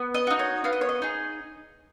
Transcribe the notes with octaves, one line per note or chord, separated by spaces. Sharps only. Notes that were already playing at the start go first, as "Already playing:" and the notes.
Already playing: B3
D#5
D#4 F#4
C#5
B3 F5
D#5
C#5
D#5
D#4 G#4